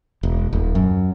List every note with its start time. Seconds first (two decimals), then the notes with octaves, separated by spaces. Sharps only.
0.23 E1
0.53 D#1
0.75 F#2